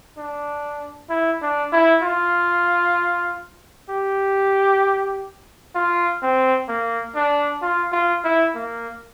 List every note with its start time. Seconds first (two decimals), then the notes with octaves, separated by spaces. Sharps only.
0.18 D4
1.10 E4
1.42 D4
1.73 E4
2.03 F4
3.90 G4
5.75 F4
6.23 C4
6.69 A#3
7.16 D4
7.62 F4
7.92 F4
8.25 E4
8.55 A#3